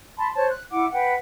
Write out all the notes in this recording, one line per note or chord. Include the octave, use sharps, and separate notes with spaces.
A5 B5 C6
C5 C#5 A5
F#6
E4 F#5 D6
B4 F#5 G5